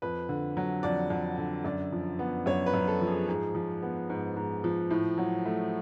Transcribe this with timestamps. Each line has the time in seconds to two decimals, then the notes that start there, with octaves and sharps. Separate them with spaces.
0.02 F2 B4
0.29 D3
0.57 F#3
0.83 F2 D5
1.10 F2
1.38 D3
1.64 F#2 D5
1.93 F3
2.19 B3
2.46 F#2 C#5
2.66 B4
2.74 F#2
2.88 A4
3.01 F3
3.07 G#4
3.28 G#2 G#4
3.55 F3
3.82 B3
4.10 G#2
4.37 G#2
4.64 F3
4.91 A2
5.18 F#3
5.46 A3